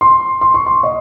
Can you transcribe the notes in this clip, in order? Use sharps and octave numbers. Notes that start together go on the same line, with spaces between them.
C6
C6
C#6
C6
D#5